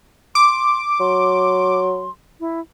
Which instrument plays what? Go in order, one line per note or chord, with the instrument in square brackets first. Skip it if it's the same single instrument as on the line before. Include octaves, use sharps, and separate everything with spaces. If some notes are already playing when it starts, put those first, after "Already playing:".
[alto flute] C6 [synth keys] D6
[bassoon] F#3 [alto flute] C6
[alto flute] E4